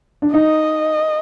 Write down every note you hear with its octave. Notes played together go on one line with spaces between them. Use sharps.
D4
D#4 D#5